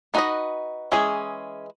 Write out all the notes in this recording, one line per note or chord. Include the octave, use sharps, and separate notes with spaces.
B3 D#4 F#4 B4 D#5
E3 G#3 C#4 G#4